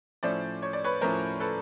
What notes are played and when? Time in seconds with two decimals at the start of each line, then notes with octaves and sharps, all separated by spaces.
0.23 A2 F3 A3 C#4 C5 D5
0.63 C#5
0.73 D5
0.84 B4 C#5
1.01 A2 F3 A3 C#4 A#4 C5
1.40 A4 B4